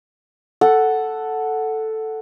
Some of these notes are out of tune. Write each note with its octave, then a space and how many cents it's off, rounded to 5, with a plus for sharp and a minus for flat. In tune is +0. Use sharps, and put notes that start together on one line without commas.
A4 +0 F#5 +0